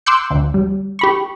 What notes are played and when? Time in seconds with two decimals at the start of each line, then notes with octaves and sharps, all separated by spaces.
0.06 C6 D6 E6 F#6 G6 C#7
0.30 D2
0.54 G3
0.99 G4 B5 C#6